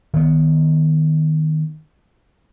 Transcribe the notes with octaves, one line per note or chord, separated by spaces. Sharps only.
D#3 B3